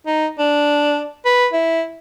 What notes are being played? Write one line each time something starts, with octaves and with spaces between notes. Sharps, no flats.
D#4
D4
B4
E4